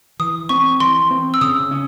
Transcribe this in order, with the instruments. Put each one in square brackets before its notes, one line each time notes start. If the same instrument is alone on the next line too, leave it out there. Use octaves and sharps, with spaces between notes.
[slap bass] E3 [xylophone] D#6
[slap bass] C4 [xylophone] C#6
[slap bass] E3 [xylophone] C6
[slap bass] C4
[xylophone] E6
[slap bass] C#3 [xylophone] D#6
[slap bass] C#4